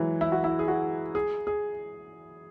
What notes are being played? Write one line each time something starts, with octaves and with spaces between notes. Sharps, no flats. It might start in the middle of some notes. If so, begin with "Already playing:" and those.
Already playing: E3 F#3 G#3
E4
F#4
E4
G#4
F#4
G#4
G#4